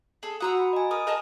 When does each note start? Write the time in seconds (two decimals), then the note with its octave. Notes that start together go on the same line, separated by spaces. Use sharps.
0.23 G#4 A4
0.40 F#4 F#5 A#5 D#6 E6
0.59 B5
0.73 D#5 G#5
0.91 A#4 D#6
1.07 A#4 D#5 G#5 A5